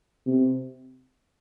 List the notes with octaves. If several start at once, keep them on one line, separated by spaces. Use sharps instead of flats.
C3